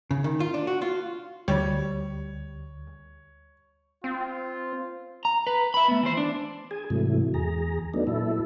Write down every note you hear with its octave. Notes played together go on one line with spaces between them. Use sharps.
C#3
D#3
F4
D4
F#4
F4
D2 G3 C#5
C4 F4
A#5
B4
E5 B5
A3 B3
E3 C5
D4
G#4 G#5
G#2 C3 E3 F#3 A3
E2 G#4 A#5
F#3 A3 B3 D4 D#4
A#2 F#3 E4 A4